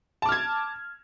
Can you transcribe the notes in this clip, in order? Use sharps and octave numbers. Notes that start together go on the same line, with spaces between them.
A5 D6 F6 G#6